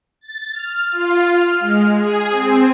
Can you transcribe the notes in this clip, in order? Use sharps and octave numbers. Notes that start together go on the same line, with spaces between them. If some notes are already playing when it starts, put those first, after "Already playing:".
A6
F6
F4
F6
G#3
G#4
C4